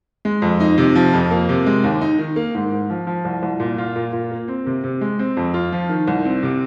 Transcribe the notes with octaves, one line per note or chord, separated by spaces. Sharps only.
G#3
F2
D#4
C3
F3
F2
A#3
C3
G#3
D#2
D#4
D#3
A#3
G#2
G#2
F3
F3
C2
C2
A#2
F4
A#2
A#2
A#3
C4
C3
C3
G#3
C4
F2
F4
F3
D#3
C2
C4
C3